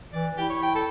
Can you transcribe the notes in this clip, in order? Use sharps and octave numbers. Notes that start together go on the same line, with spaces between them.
E3 D5
E4 G4
C#5
G5
A4